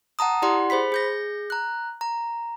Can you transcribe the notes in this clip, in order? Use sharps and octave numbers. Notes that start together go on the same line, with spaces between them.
F#5 A5 A#5 D#6
E4 G4 D5 F#5 C6
G#4 C5 B5 B6
G#4 G6 A#6
A#5 F#6
A#5